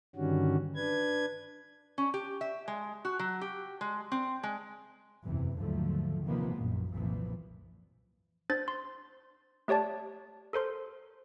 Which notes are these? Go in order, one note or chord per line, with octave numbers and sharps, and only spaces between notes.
G2 D3 D#3 G3 C#4 F#4
D4 B4 G#6
C#4
G4
E5
G#3
F#4
F#3
G4
G#3
C4
G#3
F#1 E2 C3 E3
D#2 G#2 D3 F3 F#3 A3
C3 D#3 F3 G#3 A#3 B3
A#1 F#2 A#2
F#1 C2 A#2 E3 F3
D4 C5 A6
C6
A3 G4 C#5 D5 A5
A4 A#4 C5 C6